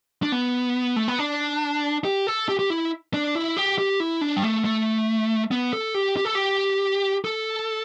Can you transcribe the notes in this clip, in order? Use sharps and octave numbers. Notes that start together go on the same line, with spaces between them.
D4
B3
A3
B3
D4
G4
A4
G4
G4
E4
D4
E4
G4
G4
E4
D4
G3
A3
A3
B3
A4
G4
G4
A4
G4
A4